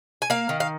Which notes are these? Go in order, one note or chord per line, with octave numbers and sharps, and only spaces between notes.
G#5
A#3 F5
D#3
F5